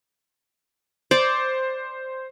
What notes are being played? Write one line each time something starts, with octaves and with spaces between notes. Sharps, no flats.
C5 D5